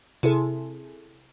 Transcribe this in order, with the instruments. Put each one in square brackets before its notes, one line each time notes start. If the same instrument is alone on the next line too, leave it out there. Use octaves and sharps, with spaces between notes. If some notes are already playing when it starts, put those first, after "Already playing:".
[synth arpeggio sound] C3 E4 G#4 A4